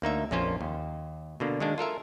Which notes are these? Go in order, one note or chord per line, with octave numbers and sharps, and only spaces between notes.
D2 A#3 D#4 E5
A#1 F2 A#3 C#4 F4 C5
D#2
B2 D3 A#3
D#3 G#3 A#3 D4
F4 A4 A#4 E5